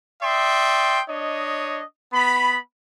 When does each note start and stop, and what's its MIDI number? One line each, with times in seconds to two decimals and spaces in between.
0.23 1.02 74
0.23 1.02 76
0.23 1.02 79
0.23 1.02 84
0.23 1.02 87
1.09 1.85 62
1.09 1.85 73
1.09 1.85 75
2.14 2.59 59
2.14 2.59 83